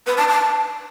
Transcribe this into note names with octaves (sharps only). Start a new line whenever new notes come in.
B4
A5
A5